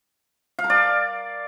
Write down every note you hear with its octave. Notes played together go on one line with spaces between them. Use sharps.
F5
A#4
D5